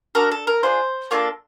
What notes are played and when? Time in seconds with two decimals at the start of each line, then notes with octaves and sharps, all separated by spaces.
0.15 D4 F#4 A4 A#4
0.31 A4
0.47 A#4
0.63 D4 F4 G#4 C5
1.11 A#3 D4 F4 A4 C#5